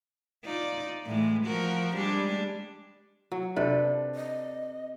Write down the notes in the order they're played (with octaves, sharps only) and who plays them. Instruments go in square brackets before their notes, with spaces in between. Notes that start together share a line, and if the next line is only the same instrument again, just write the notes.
[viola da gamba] D#4 F4 D5
A2 E3 G#3
F3 F#4 A#4
G3 G#3 D4
[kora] F#3
[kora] C3 A4 B4 [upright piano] D4
[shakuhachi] D#5